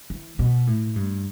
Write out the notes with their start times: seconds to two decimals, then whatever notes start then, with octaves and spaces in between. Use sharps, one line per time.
0.10 E3
0.39 B2
0.67 A2
0.96 G2